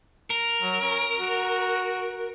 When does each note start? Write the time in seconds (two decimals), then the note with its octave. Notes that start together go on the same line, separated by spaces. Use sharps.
0.30 A#4
0.62 F#3
0.81 C#4
1.20 F#4